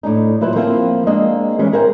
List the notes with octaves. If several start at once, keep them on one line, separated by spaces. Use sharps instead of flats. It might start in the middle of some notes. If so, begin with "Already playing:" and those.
A2 D4 D#4
A#2 F#3 E4 B4 C5
F3 A#3 C4 E4
G#3 A#3 C4 D4 D#5
E3 G3 G#3 C#4
G#4 A#4 C5 F5 G5